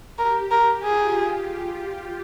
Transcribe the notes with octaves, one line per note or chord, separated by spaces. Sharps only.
G4 A#4
A#4
F4 G#4
F4